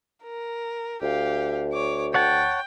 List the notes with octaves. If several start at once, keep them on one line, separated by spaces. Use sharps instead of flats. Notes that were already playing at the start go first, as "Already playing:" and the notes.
A#4
D2 G4 F5
C#5 D6
C#5 F#5 G5 A5